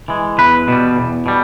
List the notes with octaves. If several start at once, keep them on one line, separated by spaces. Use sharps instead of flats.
E3 G#3
E2 B4
B2 G3
E2
B2 G3